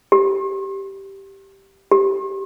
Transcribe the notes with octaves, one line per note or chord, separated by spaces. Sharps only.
G4
G4